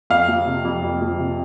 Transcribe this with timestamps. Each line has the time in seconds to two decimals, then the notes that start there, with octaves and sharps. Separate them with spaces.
0.10 F2 F5
0.28 F3
0.46 C3
0.65 F2
0.83 F2
1.02 F3
1.20 C3